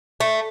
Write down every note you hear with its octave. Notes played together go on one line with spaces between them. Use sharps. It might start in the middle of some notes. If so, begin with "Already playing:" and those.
A3